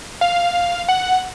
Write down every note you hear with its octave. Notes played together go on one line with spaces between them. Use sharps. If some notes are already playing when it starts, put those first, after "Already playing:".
F5
F#5